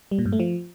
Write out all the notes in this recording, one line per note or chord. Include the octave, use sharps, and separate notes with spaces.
G3
A#2
G2
A3
F3